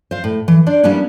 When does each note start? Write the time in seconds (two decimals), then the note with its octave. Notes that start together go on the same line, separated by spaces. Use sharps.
0.11 C5 F5
0.24 A2
0.48 E3
0.66 D4 C5 D5
0.83 G3 A#3 B3 C#4 D4 E4